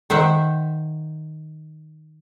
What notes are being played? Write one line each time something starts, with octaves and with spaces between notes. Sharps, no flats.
D#3 C5 E5 F#5